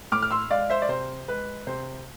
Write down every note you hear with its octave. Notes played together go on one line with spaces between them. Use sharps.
A2 D6 F6
F6
C6 E6
G#3 D5 F5
C5 E5
D5
C3 C5
G#3 B4
C3 C5